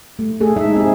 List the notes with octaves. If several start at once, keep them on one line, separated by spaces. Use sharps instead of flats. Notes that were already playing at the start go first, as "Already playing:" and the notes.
A3
A3 G#4 A4
G#3 D#4 E5
C4 G#4